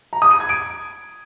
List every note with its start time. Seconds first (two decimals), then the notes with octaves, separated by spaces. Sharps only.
0.13 A#5
0.22 D#6
0.31 D#7
0.40 G#6
0.49 D7